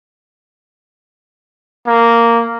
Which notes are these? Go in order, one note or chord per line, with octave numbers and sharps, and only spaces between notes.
A#3